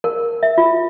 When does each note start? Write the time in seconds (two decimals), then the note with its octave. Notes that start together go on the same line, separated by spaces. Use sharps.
0.04 A#4
0.43 E5
0.58 F4